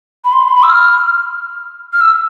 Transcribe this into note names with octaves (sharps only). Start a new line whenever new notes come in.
B5
C6
B5
C6
B5
E6
F6
F6
E6